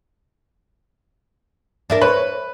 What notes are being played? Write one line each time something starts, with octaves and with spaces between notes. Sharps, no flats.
D4 E4 A#4
B4 C#5